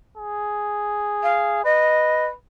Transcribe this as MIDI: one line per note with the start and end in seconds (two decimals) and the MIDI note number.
0.17 1.63 68
1.23 1.61 77
1.64 2.33 71
1.64 2.26 75